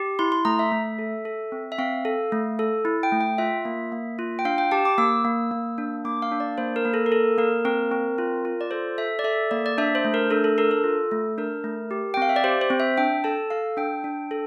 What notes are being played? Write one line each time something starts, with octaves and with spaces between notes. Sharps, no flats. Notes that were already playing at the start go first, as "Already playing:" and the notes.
Already playing: G4
E4 C6
C6
A3 A#5
E5
A3
A4
A4
C4
E5
C4 F5
A4
A3
A4
E4
G5
A3
G5
F4 E5
A#3
A#3
F4
G5
D4 F5
G5
G4 A5
D6
A#3 E6
A#3
A#3
D4
A#3 D6
F5
D4
D5
A#3 C5
A#4
A#3
A4
A#4
A4
A#3 A#4
C4 A#4
C4
F4
F4
D5
A4 C5
A4 E5
D5
A4 E5
A#3 D5
D5
D4 E5
C5
A3
A#4
D4 A4
A4
A4 A#4
A4
F4
A3
D4 A#4
A3
G4
G5
C4 F5
E5
D5
G4 C5
C5
C4
E5
D4 G5
A4 A5
A4 F5
D4 G5
D4
A4